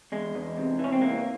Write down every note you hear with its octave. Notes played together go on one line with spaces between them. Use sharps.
E2 G#3
E2
C3
E3
C#4
C4
E3 A#3